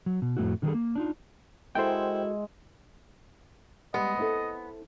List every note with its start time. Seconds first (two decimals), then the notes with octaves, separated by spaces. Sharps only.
0.06 F#3
0.22 B2
0.37 F2 A2 G#3 A3 E4 F#4
0.62 D3 D#3 G3 F#4 G#4 A4
0.74 A#3
0.95 D4 D#4 F4
1.75 G#3 E4 F#4 A4 A#4 C5 G5
3.94 G3 G#3 B3 D#5
4.17 C4 E4 A4